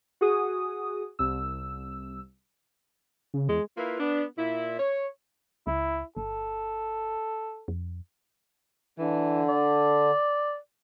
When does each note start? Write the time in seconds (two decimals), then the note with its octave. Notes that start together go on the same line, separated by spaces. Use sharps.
0.21 F#4 G#4 D#6
1.19 C2 E6
3.34 C#3
3.49 E2 G#3
3.77 A#3 E4 F4 B4
4.00 B3 D4
4.38 A#2 E4
4.80 C#5
5.67 C#2 E4
6.17 G1 A4
7.68 F2
8.99 D3 E3
9.49 D5